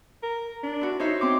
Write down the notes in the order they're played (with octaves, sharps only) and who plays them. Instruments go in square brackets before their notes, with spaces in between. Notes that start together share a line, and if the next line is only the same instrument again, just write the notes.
[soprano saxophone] A#4
D4
[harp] E4 F#4
[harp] D#4 C5 E5 [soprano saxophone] C#5
[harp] C4 C6 D6